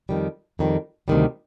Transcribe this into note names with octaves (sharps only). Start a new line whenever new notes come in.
F2 D#3 G3
F2 D#3 G3
D2 C3 D#3 G3